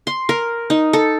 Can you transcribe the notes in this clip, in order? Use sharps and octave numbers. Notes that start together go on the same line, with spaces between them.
C6
A#4
D#4
A4